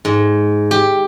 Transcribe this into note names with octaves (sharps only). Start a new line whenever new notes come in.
G#2
G4